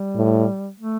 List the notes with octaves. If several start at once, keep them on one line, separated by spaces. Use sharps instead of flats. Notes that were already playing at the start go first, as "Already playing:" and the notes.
Already playing: G3
A2
A3